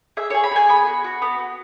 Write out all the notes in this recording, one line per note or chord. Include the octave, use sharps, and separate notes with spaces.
G#4 E5
G#4 C#5
B5
G#4 G#5
B3 B5
F#4
F#4
B3
B3